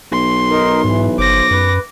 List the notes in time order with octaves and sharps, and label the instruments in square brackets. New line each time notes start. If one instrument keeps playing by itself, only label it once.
[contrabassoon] B1 [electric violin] C6
[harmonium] D#4 A#4
[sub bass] G#2 [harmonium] E3
[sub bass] G1 [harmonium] C5 [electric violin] D6 A#6
[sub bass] F#2 [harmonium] B4